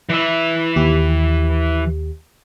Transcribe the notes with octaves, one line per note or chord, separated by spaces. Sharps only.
E3 E5
D#2 G4